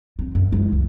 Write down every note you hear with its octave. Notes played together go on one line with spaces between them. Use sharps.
C4
F#2
G#3 E4
C#2